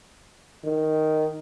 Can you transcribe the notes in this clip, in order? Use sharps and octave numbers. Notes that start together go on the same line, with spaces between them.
D#3